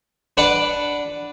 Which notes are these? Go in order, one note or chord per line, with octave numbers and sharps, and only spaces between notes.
D4 B4 D5 F#5 B5 D6